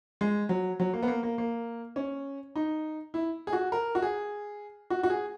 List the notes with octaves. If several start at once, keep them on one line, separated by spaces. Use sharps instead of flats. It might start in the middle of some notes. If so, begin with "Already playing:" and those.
G#3
F#3
F#3
A#3
B3
A#3
A#3
A#3
C#4
D#4
E4
G#4
F#4
A#4
F#4
G#4
F#4
F#4
G#4